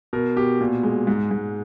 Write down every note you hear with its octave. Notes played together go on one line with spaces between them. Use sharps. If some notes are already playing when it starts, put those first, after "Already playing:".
B2 A#4
B2 G4
A#2
G#3
G#2
G#2